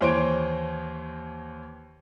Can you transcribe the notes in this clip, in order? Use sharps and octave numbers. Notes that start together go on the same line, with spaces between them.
D#2 E3 C5 C#5 D7